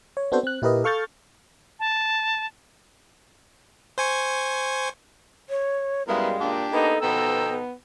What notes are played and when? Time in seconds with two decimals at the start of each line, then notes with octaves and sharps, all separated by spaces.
0.17 C#5
0.32 B3 C4 D4 F#4 A4 C5
0.43 C4 F#6
0.62 A#2 E4 G4 A#4 B4 D#5
0.84 A4 F5 C#6 F6 G6 A6
1.79 A5
3.98 C5 G#5 C#6
5.50 C#5
6.08 F#2 G3 G#3 B3 E4 A#4 F5
6.40 A#2 D4 G4
6.72 A#3 B3 D#4 A4
7.02 B2 F3 B3 D#4 G5 A#5 E6
7.49 B3